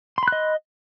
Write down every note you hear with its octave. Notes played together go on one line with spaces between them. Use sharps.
D#5 B5 C6 F#6